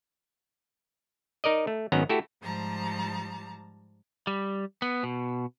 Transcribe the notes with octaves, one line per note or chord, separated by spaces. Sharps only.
D#4 A#4 D5 D#5
A3
G#1 D#3 F#3 B3 C#4 A#5
A3 E4 F#4 G4 A4
G#2 F3 G3 A5 A#5
G3
B3
B2